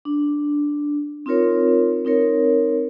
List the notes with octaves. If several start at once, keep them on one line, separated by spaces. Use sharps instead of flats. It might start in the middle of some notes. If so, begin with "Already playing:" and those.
D4
C4 D#4 F4 A#4 C#5
C4 D#4 A#4 C#5